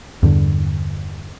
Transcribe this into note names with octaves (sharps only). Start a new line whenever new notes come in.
E2 G2 D3